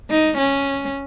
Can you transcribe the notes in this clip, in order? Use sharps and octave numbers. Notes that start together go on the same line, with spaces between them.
D#4
C#4